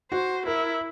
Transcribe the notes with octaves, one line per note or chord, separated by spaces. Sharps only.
F#4 C5
E4 A#4